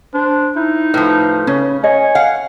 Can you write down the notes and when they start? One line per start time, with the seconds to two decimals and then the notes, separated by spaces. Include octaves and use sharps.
0.14 D4 C5
0.56 D#4 E4
0.94 A2 F3 B4
1.47 C#3 C#4
1.84 C#5 D#5 G#5
2.15 F5 F#5